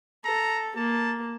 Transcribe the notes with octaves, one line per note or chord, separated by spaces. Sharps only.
A4 A#5
A#3 A5